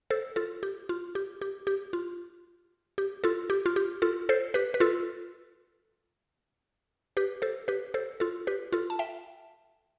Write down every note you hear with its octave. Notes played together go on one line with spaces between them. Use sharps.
A4 C5
F4 A4
G4
F4
G4
G4
G4
F4
G4
F4 A4
G4
F4
G4
F4 A4
A4 C5
G4 B4
B4
F4 A4
G4 B4
A4 C5
G4 B4
A4 C5
F4 A4
G4 B4
F4 A4
A5
E5 G5